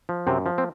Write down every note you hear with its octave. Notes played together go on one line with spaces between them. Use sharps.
F3
F#2 C3 C4
F3
C4